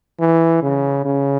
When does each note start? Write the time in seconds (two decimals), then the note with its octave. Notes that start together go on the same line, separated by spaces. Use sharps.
0.20 E3
0.63 C#3
1.06 C#3